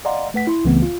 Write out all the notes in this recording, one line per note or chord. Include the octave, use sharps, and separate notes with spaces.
D5 D#5 F5 F#5 A#5 C6
A3 B4 F#5 B6
E4 C6
C#2 C#3 E3 A3 B3 C4
F4